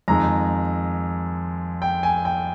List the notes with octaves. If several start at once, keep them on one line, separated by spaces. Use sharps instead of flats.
F2 D#3 G#3 A#5
G5
G#5
G5